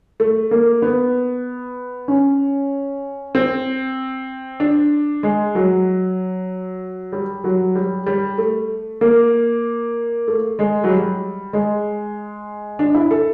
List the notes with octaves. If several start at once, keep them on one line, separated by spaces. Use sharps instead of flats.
A3
A#3
B3
C#4
C4
D4
G#3
F#3
G3
F#3
G3
G3
A3
A#3
A3
G#3
F#3
G3
G#3
D4
E4
A4